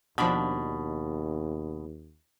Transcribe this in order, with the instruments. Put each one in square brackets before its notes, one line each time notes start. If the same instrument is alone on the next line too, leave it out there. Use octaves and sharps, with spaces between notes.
[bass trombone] D#2 [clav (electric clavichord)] B2 [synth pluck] F3 D4 B5